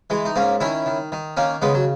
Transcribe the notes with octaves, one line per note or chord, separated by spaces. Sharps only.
E3 G#3
D#4
G#2 A#3 C#4
D#3 C#4 E4
D#3
D#3
D#3 A#3 C#4
C#3 G#3 B3
F#3